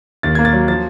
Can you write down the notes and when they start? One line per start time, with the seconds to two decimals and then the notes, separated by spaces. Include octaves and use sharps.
0.23 D#2 A6
0.35 A#3 G#6
0.45 A6
0.53 F#3
0.68 F3 A6